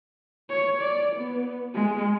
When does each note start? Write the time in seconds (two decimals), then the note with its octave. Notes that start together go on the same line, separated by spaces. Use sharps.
0.50 C#5
0.81 D5
1.15 B3
1.74 G#3